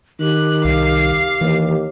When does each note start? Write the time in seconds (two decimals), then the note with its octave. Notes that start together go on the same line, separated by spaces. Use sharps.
0.20 D#3 G4 F#6
0.65 C2 F5
1.41 D#2 E3